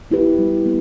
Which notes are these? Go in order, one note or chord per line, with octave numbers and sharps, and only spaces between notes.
B3 E4 G4 B4
G3
B3